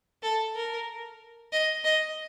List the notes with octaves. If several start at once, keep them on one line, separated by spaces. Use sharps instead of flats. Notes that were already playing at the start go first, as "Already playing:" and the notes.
A4
A#4
D#5
D#5